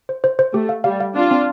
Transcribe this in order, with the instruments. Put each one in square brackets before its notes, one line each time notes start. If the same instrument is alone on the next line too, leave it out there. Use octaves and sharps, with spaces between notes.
[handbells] C5
C5
C5
[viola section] A3 [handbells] G4
[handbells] F5
[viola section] G3 [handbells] F5
[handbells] F5
[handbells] C4 [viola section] D4 F4
[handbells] C4